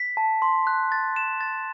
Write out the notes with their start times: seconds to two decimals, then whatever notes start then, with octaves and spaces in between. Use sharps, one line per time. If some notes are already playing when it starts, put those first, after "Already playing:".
Already playing: B6
0.17 A5
0.42 C6
0.67 F#6
0.92 A6
1.16 E7
1.41 A6